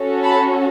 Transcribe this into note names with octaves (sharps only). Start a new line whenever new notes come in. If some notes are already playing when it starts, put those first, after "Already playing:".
Already playing: C#4 F#4 A4
A5 B5